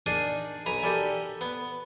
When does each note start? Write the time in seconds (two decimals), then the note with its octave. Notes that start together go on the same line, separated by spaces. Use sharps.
0.06 D4 D#4 G#4 A#4 D5 G#5
0.66 B1 G#5 A#5 B5
0.83 G4 A4 A#4 D5 E5 G#5
1.41 B3